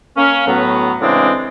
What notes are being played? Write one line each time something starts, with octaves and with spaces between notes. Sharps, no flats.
A#3 C#4
A2 F#3 B3
A2 C#3 E3 G#3 C4 D4